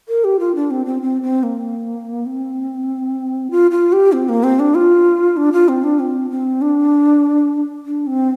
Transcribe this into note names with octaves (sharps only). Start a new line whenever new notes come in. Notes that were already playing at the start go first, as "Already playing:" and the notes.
A#4
G4
F4
D4
C4
C4
C4
C4
A#3
C4
F4
F4
G4
C4
A#3
C4
D4
F4
D4
F4
C4
D4
C4
C4
D4
D4
C4